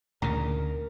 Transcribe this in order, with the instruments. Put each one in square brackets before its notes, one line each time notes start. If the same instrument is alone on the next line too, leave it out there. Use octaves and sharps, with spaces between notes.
[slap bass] D2 A#2 C#3 [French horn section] A#4 [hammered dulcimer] A#5